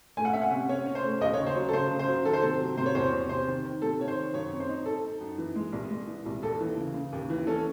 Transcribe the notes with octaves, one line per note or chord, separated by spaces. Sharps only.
A3 G#5
F#5
C#4 E5
F#5
C3
C#4 C#5
C#4
C5
A3
D#2 D#5
C#5
C#3
C5
F#3
A4
C#3 C5
C#3
C5
F#3
D#3 A4
C5
C3 A4
F#3
C3 C5
C#5
E2 C5
C3
C3 C5
D#3
D#3
C3 A4
D#3 C#5
C5
D#3
F#2 C#5
C4
C5
D#4
D#4 A4
D#4
F#2
E3
G#3
C2
G#3
E3
C2
D#2 A4
E3
C#3
C#3
D#2
E3
C#4 A4